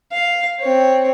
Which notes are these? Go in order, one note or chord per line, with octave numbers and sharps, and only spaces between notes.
F5
C4 C#5